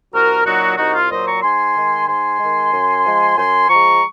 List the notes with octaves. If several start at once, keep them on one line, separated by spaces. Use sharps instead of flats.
C2 F#4 A#4
A#2 F#3 D#4 F#4
C2 D#4 F#4
F4
A#2 F#3 C5 D#5
A#5 C#6
G#2 G#5 C6
D#3 G#3
G#2 G#5 C6
D#3 G#3
F#2
F3 G#3
F#2 G#5 C6
F3 G#3 A#5 C#6